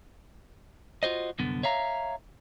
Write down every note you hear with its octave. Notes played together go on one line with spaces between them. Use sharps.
F4 F#4 C5 D#5
C2 F#2 D3 B3
C#5 E5 F5 A#5